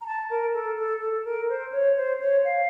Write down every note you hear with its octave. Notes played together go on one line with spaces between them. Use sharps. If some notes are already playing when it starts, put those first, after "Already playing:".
A#5
A5
A#4
A4
A4
A4
A#4
C5
C#5
C5
C#5
F5